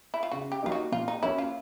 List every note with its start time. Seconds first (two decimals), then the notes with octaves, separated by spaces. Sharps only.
0.14 E4
0.23 F4
0.32 C#3 F#4
0.52 G4
0.62 F#3 A#3 D#4 F4
0.72 F#4
0.92 A#2 F4
1.08 D#4
1.23 F#3 A#3 C#4 E4
1.38 F4